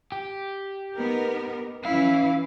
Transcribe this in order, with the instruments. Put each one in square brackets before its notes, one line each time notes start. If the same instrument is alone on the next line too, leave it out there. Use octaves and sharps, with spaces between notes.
[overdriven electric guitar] G4
[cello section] B3 D#4 A#4
[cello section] E3 C#4 E4 [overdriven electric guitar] F5